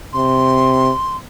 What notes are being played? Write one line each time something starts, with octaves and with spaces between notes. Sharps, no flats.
C3 C6